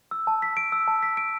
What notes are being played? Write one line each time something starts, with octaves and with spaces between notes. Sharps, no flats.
E6
A5
B6
D7
E6
A5
B6
D7